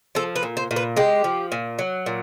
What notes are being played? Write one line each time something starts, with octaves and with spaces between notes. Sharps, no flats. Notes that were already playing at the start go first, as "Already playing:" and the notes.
F3 A4
B4
A#2
C5
A#2
B4
G#3 G4
F3
A#2
F#3
A#2